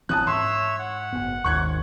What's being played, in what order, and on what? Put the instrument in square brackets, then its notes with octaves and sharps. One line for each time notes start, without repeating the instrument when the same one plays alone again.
[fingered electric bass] G#1 E3 C4 [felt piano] A5 D#6 F#6
[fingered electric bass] G#2 [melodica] C#5 E5 E6 [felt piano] C6
[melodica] F#5
[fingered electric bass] F#1 B3
[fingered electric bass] G#1 D#2 [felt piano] C#6 F#6 G#6